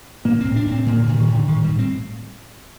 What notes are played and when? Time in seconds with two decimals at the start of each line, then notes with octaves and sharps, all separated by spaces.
0.25 A2 A#3
0.41 A2 C4
0.56 D4
0.67 A2 C4
0.86 A2 A#3
1.02 D3
1.07 A2
1.18 D#3
1.28 A2
1.33 D3
1.48 A2 D#3
1.64 A2 G3
1.79 C4